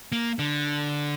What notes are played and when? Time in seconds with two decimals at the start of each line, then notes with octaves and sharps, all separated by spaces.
0.12 A#3
0.39 D3